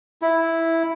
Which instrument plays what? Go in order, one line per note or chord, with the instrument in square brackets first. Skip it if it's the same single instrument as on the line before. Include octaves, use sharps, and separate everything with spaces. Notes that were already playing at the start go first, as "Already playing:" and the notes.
[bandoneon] E4